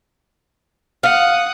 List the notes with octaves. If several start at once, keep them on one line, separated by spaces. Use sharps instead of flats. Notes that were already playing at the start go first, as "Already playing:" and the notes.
F5 F#5 D#6